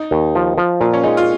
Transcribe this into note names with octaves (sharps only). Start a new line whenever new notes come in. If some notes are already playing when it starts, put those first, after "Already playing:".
Already playing: D#4
D#2
F3
F3
A#2 F4
C#4
G#3 D#4
F4